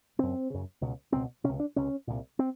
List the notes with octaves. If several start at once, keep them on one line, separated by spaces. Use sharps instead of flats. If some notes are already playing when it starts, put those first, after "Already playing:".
F#2 C#3 C4
F#2 C#3
C#2 B2
C#2 B2 C4
C#2 C3 C#4
D4
C#2 C3 C#4
C2 A#2
C4